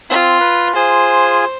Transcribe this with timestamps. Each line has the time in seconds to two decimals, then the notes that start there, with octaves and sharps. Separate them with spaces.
0.10 C4 F4
0.40 B4
0.76 F4 G#4 C5 G#5